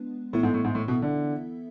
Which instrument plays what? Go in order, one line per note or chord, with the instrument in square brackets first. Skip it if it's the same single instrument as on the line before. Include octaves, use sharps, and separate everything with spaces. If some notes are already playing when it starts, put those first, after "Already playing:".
Already playing: [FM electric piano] G#3 B3 D4 B4
[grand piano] A2 [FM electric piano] E3 B3 E4 A4 E5
[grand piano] G#2
A2
G#2
A2
B2
D3